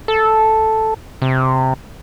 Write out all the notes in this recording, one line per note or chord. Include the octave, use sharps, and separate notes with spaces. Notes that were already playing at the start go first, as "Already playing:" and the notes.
A4
C3